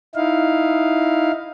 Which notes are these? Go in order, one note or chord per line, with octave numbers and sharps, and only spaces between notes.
D#4 E4 F5